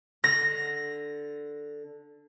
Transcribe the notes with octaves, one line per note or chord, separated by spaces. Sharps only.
D3 A#6